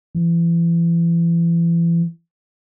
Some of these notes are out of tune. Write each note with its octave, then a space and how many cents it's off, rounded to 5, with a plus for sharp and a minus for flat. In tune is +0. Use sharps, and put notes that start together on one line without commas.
E3 +35